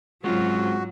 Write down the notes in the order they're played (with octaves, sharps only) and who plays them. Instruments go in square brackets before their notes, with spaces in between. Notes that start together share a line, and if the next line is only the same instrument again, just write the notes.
[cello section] G#2 F#3 [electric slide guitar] G#3 C4 C#4 [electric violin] F4 [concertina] F#4